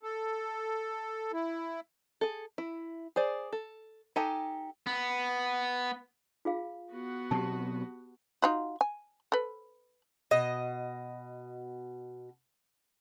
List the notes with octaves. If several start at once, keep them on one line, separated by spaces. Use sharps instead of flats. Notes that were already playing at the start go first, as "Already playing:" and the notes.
A4
E4
G#4 A4
E4
G#4 C5 D5
A4
D#4 G4 A4 G#5
B3
F4 G#4 F5
B3 F#4
B2 F#3 C4 G4 A5
D#4 F4 F#4
G#5
A4 B4
B2 D#5